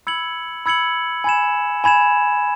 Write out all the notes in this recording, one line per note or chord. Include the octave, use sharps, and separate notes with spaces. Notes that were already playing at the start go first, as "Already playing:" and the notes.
B5 E6 G#6 C#7 F#7
B5 E6 G#6 C#7 F#7
G#5 B5 G#6 E7
G#5 B5 G#6 E7